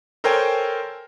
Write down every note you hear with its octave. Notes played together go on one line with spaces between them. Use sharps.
A4 A#4 C5 C#5 G5 G#5